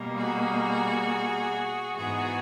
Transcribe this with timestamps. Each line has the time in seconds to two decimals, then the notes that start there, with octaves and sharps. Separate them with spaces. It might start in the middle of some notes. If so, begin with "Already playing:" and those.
Already playing: B2 G3 A#3
0.17 F#4 G#4
1.95 G#2 E3 G#3 B3 F#4 G#4